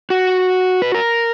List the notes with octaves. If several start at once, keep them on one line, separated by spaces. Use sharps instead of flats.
F#4
B4
A#4